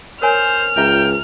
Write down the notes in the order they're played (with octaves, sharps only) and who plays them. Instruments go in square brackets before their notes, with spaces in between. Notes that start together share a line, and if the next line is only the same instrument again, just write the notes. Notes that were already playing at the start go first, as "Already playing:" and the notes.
[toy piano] A#4 C#5 G#5 [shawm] C5 [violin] F6
[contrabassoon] C#2 [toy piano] F4 E5 A#5 [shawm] G5